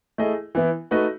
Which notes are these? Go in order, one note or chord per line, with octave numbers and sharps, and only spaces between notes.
A3 E4 G#4 D#5
E3 B3 E4
A3 D#4 F#4 B4 D#5